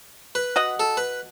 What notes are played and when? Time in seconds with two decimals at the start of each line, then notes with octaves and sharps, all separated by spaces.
0.35 B4
0.56 F#4 D#5 F#5
0.80 A4
0.97 B4